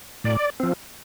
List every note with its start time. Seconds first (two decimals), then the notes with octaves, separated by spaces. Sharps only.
0.24 A2 D5
0.60 F3 C4